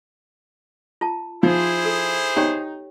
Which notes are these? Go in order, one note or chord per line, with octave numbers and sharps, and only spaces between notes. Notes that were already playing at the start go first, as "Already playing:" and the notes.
F4 A5
F3 D#4 E4 G#4 C5
A4
D#4 G4 C#5 G5